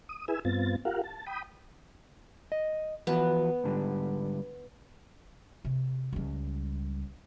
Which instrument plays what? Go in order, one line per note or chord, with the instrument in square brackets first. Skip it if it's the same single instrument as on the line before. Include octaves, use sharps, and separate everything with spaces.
[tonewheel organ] D#6
E4 G#4 B4 G#5 E6
G2 B3 C4 F4 A6
F4 G4 A#4 F5 F#5
A5
G5 B5 D#6
[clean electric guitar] D#5
[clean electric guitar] E3 F3 F#4 [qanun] B3
[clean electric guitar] G#2 D3 G3
[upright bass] C3
C#2 G3